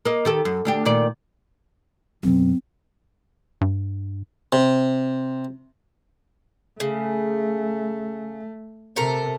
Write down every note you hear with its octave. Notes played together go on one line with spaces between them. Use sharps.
A#3 D#5
D#3 G4 A4
F#2
D2 D4 G4
A#2 D#3 D5
F#2 B2 C4
G2
C3
C#3 A3
C3 A3 A4 A#4